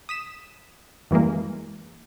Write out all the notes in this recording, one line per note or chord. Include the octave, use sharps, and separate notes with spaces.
D#6 B6 E7
F#2 E3 G3 G#3 A#3